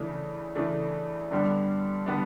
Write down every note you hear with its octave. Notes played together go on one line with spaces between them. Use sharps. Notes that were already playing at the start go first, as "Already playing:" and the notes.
Already playing: C#3 E3 A3 D4
C#3 E3 A3 D4
G2 D3 G3 B3 D4
D3 G3 B3 D4